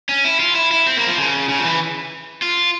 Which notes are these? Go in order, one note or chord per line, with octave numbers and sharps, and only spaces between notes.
C#4
E4
F4
E4
E4
C4
A#3
F3
C#3
C#3
F3
E3
F4